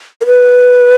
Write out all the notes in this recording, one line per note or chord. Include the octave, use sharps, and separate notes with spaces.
A#4
B4